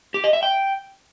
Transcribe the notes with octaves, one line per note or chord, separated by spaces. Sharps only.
G4
D#5
E5
G5